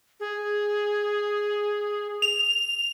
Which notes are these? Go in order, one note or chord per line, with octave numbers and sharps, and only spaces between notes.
G#4
F7